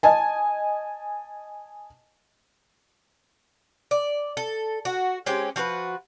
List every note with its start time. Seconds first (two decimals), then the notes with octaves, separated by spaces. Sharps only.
0.03 D#5 G#5 A5
3.91 D5
4.37 A4
4.85 F#4
5.26 G#3 C4 C#4 G4
5.56 F3 F#4 A4 B4